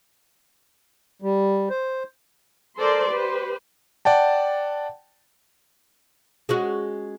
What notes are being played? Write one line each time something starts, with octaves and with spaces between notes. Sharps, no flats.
G3
C5
A4 A#4 C5 D5 C6
G4 B4 C5
D5 F#5 G5 A5
G#3 C#4 F#4